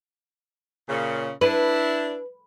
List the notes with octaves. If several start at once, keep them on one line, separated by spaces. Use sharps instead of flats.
A#2 C#3
D4 E4 B4